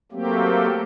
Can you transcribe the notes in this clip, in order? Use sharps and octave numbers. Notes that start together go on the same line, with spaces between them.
F#3 A3 A#3 C4 G4